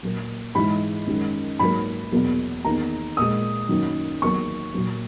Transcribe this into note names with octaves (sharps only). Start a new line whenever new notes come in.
A#2 F#3 A#3
G#2 E3 G#3 B5
F#2 D#3 G#3
G#2 F#3 A#3 B5
E2 B2 F#3 A#3
E2 D#3 A#3 A#5
A#2 G#3 D#6
F#2 D#3 F#3 A#3
E2 D#3 F#3 A#3 C#6
A#2 F#3 A#3